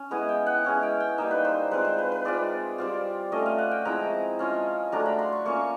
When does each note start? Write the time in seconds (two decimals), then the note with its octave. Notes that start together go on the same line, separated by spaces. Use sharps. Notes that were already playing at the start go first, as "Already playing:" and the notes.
Already playing: C#4
0.11 G#3 B3 E4 G#5
0.29 G5
0.47 F#5
0.65 G#3 C#4 E4
0.83 G5
1.00 G5
1.18 G3 A#3 D#4 E5
1.31 B4
1.45 C5
1.71 G#3 C4 F4 B4
1.85 C5
1.98 B4
2.12 B4
2.25 G#3 C4 F4 D5
2.78 G3 C4 F4
3.32 A3 C#4 F4 D#5
3.46 F5
3.58 F#5
3.71 G5
3.85 F3 G#3 C4 E4 A#5
4.39 G#3 C#4 F4
4.92 F#3 A3 D4 F4 A#5
5.06 B5
5.19 C6
5.32 C#6
5.45 A#3 C#4 F4 C#6